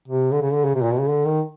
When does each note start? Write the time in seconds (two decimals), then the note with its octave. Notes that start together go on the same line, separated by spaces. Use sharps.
0.08 C3
0.32 D3
0.41 C#3
0.53 D3
0.64 C#3
0.75 C3
0.83 A#2
0.91 B2
1.00 C#3
1.09 D3
1.25 D#3